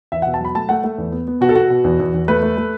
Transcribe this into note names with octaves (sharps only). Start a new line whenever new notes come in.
E2 E5
B2 F#5
A5
F#3 B5
A3 A5
A3 F#5
A3
E2
B3
B3
B2 F#4
A4
B2 F#4
B2
E2
E2
E2
A3 B4
A3
A3